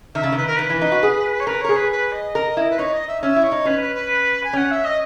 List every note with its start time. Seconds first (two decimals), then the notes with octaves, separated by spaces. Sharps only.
0.15 D#3 E5
0.23 C#3
0.32 D#3 B4
0.47 A#4
0.56 D#3 B4
0.70 E3
0.82 D#4
0.92 F#4
1.03 G#4
1.40 C#5
1.47 A#4 B4
1.61 A#4 C#5
1.69 G#4
1.76 B4
1.91 B4
2.12 D#5
2.35 A#4
2.57 E4
2.70 B4
2.78 D#4 C#5
2.93 D#5
3.08 E5
3.22 C#4 E5
3.36 E4
3.43 C#5
3.52 D#4
3.65 C#4 B4
3.81 B4
3.94 B4
4.44 G#5
4.53 C#4 F#5
4.71 E5
4.85 D#5